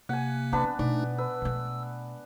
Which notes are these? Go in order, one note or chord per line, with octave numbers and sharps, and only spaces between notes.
C3 A#3 F#5 G#5
B3 C4 D4 B4
B2 A3 D4 D#4 D5
B4 E6
B2 A3